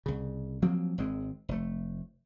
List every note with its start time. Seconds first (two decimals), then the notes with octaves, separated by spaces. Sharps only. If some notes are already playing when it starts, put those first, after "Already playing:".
0.06 C2 C#3
0.62 F3 F#3 A#3 C4
0.98 G#1 G#3 C4
1.49 F1 A3